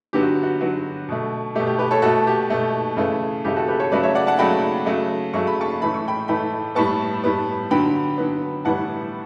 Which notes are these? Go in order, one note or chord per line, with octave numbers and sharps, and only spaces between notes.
D3 F#3 B3 G4
F#4
F#4
D3 F#3 B3 F#4
B2 A3
B2 A3 G4
G4
G4 B4
A4 C#5
B2 A3 F#4 A4
G4
B2 A3
C#3 E3 A3
C#3 E3 A3 G4
F#4 A4
G4 B4
A4 C#5
C#3 F#3 A3 B4 D5
C#5 E5
D5 F#5
F#5 A5
C#3 F#3 A3 G5 B5
C#3 F#3 A3
C#3 F#3 A3 C#6
B5
A5 C#6
A2 E3 A3 B5
C#6
G5 B5
A2 E3 A3 G5 B5
A2 G3 B3 A5 C#6
A2 G3 B3
D3 F#3 B3 G5 B5
D3 F#3 B3
A2 E3 G3 B3 F#5 A5